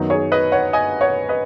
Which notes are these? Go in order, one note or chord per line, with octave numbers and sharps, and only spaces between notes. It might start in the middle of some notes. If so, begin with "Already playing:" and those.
Already playing: F#2 D#3 F#3 B3 D#4
G#4 C#5
B4 D#5
C#5 F#5
D#5 G#5
C#5 F#5
B4 D#5